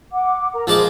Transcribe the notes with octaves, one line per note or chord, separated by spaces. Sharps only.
F#5 D6
A#4 A#5
F3 G#3 G#4 C5 A5 D6